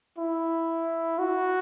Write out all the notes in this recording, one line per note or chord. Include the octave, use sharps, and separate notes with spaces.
E4
F#4